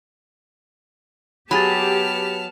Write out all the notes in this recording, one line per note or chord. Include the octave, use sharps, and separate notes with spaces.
F#3 B3 G4 G#4 A5 B5 F6 A6